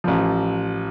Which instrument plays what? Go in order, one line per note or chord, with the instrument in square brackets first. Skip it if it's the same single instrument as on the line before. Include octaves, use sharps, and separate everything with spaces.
[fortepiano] A1 F3